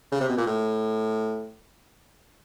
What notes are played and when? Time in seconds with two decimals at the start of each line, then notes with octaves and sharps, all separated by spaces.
0.12 C#3
0.21 C3
0.29 B2
0.38 A#2
0.46 A2